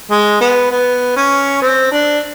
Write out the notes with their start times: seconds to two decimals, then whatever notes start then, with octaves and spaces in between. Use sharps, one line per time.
0.11 G#3
0.41 B3
0.71 B3
1.16 C#4
1.62 C4
1.91 D4